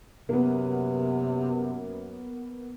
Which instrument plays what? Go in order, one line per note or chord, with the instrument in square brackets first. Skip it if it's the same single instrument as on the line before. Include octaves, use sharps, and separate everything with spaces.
[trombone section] F#2 [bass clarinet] C3 [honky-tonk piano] A#3 B3